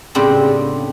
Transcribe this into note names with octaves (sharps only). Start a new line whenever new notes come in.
A2 C#3 B3 C4 D4 G4